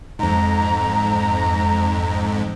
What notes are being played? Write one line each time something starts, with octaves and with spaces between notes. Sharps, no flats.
F2 G#2 A#5